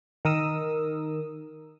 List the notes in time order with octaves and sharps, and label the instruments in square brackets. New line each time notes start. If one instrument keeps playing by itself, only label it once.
[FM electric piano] D#3 A#4 D#6 E6